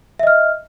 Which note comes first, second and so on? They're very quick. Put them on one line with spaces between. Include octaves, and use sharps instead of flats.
E5 D#5 F6